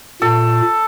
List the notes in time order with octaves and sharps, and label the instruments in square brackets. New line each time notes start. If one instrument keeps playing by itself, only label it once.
[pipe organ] A#2 [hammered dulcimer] A4